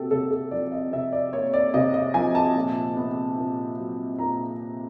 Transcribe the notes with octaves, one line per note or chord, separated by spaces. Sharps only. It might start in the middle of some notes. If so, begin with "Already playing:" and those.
Already playing: C3 A#3 F#4 G4 A4
C3 A4
A4
F3 D5
D#5
C3 E5
D5
A#3 C#5
D5
C3 D#5
D#5
F3 G#5
A5
A#2
B3
A#2
F#3
A#2 A#5